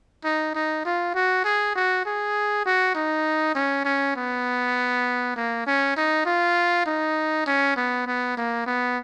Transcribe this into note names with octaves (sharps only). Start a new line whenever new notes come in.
D#4
D#4
F4
F#4
G#4
F#4
G#4
F#4
D#4
C#4
C#4
B3
A#3
C#4
D#4
F4
D#4
C#4
B3
B3
A#3
B3